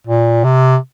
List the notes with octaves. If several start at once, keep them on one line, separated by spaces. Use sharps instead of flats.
A#2
C3